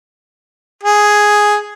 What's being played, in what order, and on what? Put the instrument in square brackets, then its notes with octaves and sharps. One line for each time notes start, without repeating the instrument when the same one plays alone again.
[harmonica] G#4